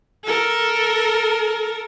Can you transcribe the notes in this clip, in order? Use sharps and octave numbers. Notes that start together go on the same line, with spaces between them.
A4 A#4